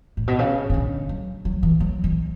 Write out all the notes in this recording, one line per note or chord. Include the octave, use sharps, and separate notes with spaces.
A2
B2
C#3
C#3
D3
F#3
F#3
E3
F#3
E3